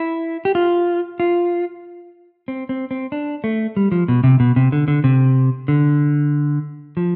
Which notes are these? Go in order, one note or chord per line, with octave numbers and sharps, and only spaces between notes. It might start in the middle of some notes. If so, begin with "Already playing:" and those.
Already playing: E4
G4
F4
F4
C4
C4
C4
D4
A3
G3
F3
B2
C3
B2
C3
D3
D3
C3
D3
F3